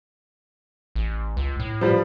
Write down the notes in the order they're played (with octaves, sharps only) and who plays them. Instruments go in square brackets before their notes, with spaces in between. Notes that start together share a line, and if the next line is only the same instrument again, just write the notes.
[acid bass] A1
C#2
A2
[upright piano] F3 G3 B4